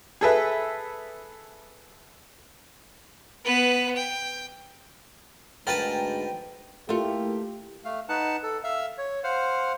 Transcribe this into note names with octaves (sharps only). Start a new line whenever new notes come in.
G#4 A4 B4 E5
B3 B4
G5
D2 G#2 A#4 B4 G5 A5 A6
A3 A#3 E4 F4 G4
A3 F5
D#4 B4 F#5 A5
A4
E5 F5 E6
C#5
C5 F5 F#5